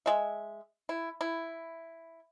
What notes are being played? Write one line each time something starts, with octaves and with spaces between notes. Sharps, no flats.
G#3 E5
E4
E4